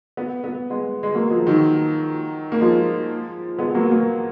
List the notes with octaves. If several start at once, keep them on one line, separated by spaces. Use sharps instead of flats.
B3
B3
G#3 B3
G#3
F#3 A#3
F3 G#3
D#3 F#3
A#3
F3 G#3
G#3 B3
F#3 A#3
F#3 A#3